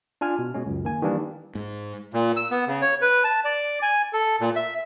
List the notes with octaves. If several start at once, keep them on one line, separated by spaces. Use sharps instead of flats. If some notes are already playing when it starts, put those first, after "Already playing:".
D4 F4 G#5 F6
B2
B2 G#3 C#4
C#2 F#2
D#3 A#3 G#5
D#3 E3 G3 A#3 D4
G#2
A#2
E6
B3
C#3
C#5
B4
A5
D5
G#5
A4
A#2
E5